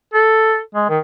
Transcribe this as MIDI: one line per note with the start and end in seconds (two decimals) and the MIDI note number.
0.14 0.60 69
0.74 0.86 56
0.89 0.99 51